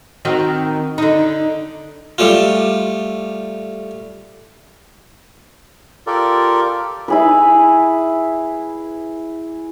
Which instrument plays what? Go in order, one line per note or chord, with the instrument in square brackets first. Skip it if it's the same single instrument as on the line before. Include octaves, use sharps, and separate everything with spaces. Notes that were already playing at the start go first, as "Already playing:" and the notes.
[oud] D#3 C4 F#4
D3 D#4
[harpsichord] G3 A3 F4
[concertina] F4 G4 A4 A#4 D5
[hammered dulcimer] E4 G#4 B4